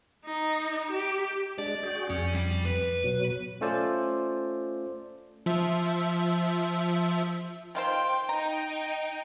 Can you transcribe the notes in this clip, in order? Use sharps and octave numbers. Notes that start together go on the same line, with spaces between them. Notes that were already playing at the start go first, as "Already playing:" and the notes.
D#4
G4
G#3 D4 D5
F#4 G#4 G5
F2 C#4
G3
B4
B2 F#3
A3 C#4 F4 A4 C5 D5
F3 E5
D#3 F4 C5 G5
D#4 G5 A#5